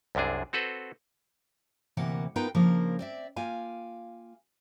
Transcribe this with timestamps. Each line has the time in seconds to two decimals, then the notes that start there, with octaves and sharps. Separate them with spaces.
0.15 C2 F#2 C3 D4 G#4
0.53 C4 F#4 A4 B4 C5
1.97 D2 C3 E3 A#3 A#4 F#5
2.36 B3 D#4 F4 A#4 B4 G5
2.55 C#3 F3 A#3 D4 A#4 C5
2.99 C4 D5 E5
3.36 A#3 F4 F5 G5 G#5